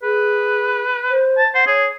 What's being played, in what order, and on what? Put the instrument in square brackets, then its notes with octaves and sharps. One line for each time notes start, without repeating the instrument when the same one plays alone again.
[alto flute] G#4 [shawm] B4
[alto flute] C5
[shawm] A5
[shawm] C5 [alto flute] F#5
[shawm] G#4 [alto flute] C#5